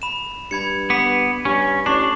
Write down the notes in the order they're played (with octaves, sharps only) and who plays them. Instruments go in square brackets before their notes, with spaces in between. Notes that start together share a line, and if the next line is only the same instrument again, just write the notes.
[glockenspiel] B5 E7
[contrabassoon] G2 [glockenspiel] B5 G#6 C#7
[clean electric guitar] B3 [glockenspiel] B5 D6 B6
[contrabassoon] G2 [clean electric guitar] C#4
[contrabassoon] A1 [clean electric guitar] D4 [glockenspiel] C#6 C7 F#7